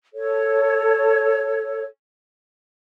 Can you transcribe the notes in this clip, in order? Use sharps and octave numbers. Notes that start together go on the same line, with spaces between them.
A4 C#5